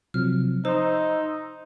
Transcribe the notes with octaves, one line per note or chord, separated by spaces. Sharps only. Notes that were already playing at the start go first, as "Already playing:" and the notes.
C3 F3 F#3 F6
D#4 C5 C6 E6